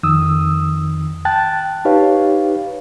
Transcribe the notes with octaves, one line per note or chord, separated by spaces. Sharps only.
F2 D#3 D#6 E6
G5 A5 F#6 A6
D#4 G4 B4 C#5 F5